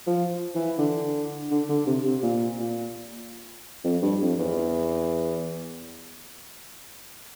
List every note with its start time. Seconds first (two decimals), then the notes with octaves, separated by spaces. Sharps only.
0.07 F3
0.55 E3
0.78 D3
1.51 D3
1.69 D3
1.87 C3
2.05 C3
2.23 A#2
2.59 A#2
3.84 F2
4.02 G2
4.21 F2
4.39 E2